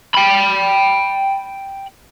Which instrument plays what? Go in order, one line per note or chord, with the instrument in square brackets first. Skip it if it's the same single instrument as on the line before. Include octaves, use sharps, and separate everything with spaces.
[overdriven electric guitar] G5 B5